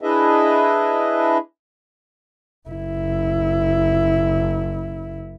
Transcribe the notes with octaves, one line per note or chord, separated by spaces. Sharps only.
D4 E4 G#4 B4 D#5 E5
F#1 E4